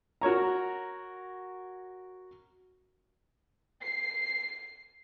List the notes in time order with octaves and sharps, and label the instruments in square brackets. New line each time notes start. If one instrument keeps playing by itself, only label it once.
[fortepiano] F#4 A#4 C#5 A#5
[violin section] C7